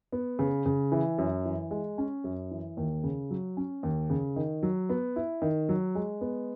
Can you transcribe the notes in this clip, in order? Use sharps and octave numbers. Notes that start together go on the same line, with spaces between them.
B3
C#3
C#3
E3
F#2
E3
G#3
C#4
F#2
E3
D#2
C#3
F#3
C#4
D#2
C#3
D#3
F#3
B3
E4
D#3
F#3
G#3
B3